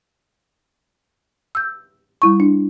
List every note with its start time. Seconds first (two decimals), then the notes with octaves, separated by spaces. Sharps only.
1.55 E6 G6
2.22 G3 E4 C#6
2.40 D4